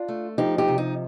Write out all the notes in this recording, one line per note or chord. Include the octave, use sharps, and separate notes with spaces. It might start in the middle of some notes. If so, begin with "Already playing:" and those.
Already playing: D4 F4
A3
F3 D#4 G4
D#4 G4
C3
D#4